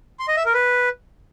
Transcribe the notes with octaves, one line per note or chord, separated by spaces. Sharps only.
C6
D#5
E5
A#4
B4